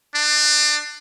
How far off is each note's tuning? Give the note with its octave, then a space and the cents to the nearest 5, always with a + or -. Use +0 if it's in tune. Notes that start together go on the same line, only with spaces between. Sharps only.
D4 +30